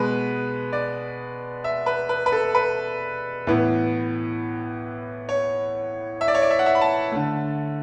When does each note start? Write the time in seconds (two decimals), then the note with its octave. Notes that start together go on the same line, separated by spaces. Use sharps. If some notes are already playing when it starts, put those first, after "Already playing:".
Already playing: B2 G#3 B3 B4
0.73 D5
1.64 E5
1.86 B4
2.09 B4
2.26 B4
2.32 A4
2.55 B4
3.47 A2 E3 B3
5.29 C#5
6.21 E5
6.28 D5
6.34 C#5
6.42 D5
6.50 E5
6.59 F#5
6.66 E5
6.75 B5
6.81 A5
7.12 D3 A3